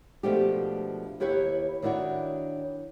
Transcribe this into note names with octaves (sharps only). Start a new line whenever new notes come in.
B2 F3 G#3 A3 D4 G4
D#2 E4 G4 B4 C#5
D#3 D4 E4 F#4 C#5